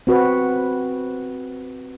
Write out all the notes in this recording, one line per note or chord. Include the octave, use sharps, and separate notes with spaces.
C4 F#4 B4